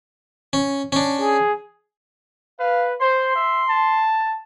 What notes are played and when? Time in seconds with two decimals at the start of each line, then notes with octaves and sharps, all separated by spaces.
0.53 C#4
0.92 C#4 D4
1.21 G#4
2.59 B4 F5
3.00 C5 C6
3.35 E5
3.68 A5